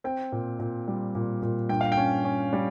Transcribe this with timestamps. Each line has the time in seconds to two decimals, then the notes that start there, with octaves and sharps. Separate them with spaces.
0.04 C4 G5
0.32 A#2
0.59 A#2
0.88 G3
1.15 A#2
1.42 A#2
1.69 G2 G5
1.81 F5
1.92 G5
1.97 C#4
2.25 C#4
2.53 G3